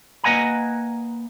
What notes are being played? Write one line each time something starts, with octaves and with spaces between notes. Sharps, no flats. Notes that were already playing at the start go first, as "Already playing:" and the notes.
A#3 B4 D#5 F#5 G#5 A#5